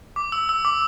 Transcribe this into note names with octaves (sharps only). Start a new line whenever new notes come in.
D6
E6
E6
D6